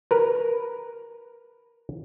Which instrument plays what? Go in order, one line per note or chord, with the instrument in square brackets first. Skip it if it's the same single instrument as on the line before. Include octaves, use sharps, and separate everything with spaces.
[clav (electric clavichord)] A#4 B4